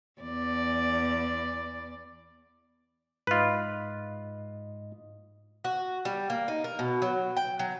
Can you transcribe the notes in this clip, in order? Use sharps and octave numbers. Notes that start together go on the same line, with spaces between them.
E2 D5
G#2 F4 B4 D#5
F#4
G3
A#3
D#4
A#4
B2
F#3
G5
F#3